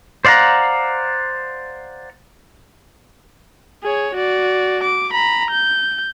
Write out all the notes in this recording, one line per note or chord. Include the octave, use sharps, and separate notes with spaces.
C5 D5 F5 F#5 A#5
G#4 C#5
F#4 D5
D6
A#5 B5
G6